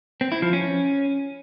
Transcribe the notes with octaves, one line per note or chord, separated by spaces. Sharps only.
C4
E4
F3
C#4